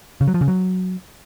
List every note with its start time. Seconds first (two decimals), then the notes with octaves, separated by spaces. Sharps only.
0.21 C#3
0.28 F#3
0.34 F3
0.41 C#3
0.48 F#3